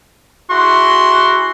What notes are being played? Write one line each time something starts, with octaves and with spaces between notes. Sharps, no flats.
E4 F#4 G#4 C6